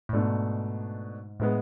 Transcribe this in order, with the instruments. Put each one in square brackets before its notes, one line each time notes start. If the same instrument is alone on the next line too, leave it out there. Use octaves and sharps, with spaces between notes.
[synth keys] A2
[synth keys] G#2 [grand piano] B2 A3 D4
[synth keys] A2 [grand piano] G#3 B3